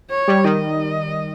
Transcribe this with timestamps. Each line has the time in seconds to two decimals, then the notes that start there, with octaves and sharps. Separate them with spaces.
0.11 C#5
0.28 G3
0.45 D#3 D#5